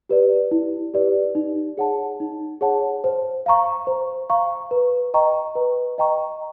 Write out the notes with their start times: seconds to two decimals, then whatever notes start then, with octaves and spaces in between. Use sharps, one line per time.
0.09 G4 B4 D5
0.51 E4
0.94 G4 B4 D5
1.35 D#4
1.77 G#4 C#5 F#5 A5
2.20 D#4
2.61 G#4 C#5 F#5 A5
3.04 C5
3.46 F5 A#5 C#6
3.87 C5
4.30 F5 A#5 C#6
4.71 B4
5.14 D#5 G5 A#5 C#6
5.55 B4
5.98 D#5 G5 A#5 C#6